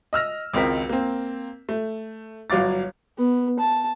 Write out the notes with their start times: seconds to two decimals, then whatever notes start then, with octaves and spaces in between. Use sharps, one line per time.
0.13 D#5 E6 F6 A#6
0.54 G#1 C#2 C4 A#4 B6
0.89 A#3 C4
1.69 A3
2.50 G1 F#3 F5 D6 A6
3.18 B3
3.59 A5